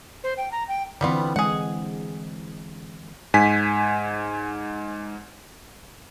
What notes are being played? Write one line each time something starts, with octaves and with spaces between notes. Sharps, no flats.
C5
G5
A#5
G5
D3 E3 G3 B3 C4 F4
G#3 G#4 F#5
G#2 G#5 B6